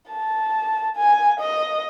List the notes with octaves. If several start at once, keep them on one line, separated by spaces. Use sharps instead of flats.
A5
G#5
D#5